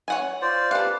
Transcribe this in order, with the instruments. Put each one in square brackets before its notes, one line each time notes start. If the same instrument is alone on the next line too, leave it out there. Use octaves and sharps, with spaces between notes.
[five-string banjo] C#5 F#5 G#5
[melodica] F4 C5 D5
[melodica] G4 B4 [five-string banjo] A4 F5